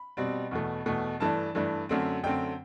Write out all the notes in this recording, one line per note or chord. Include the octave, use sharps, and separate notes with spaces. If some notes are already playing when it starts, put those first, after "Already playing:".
Already playing: B5
B2 G3 C4
E2 B2 A3
E2 B2 A3
G2 E3 A3 D4 A5
G2 E3 A3 D4
F#2 D3 A3 C4
F#2 D3 A3 C4 G5